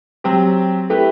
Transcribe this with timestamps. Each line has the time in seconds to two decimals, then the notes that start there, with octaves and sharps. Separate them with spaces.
0.24 F#3 C4 G4
0.90 A3 E4 G4 B4